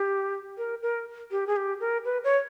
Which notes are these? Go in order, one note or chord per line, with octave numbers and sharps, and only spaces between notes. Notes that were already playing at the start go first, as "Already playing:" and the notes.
Already playing: G4
A#4
A#4
G4
G#4
G4
A#4
B4
C#5